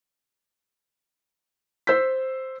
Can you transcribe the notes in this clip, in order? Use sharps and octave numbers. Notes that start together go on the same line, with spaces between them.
C5 E6 G6 B6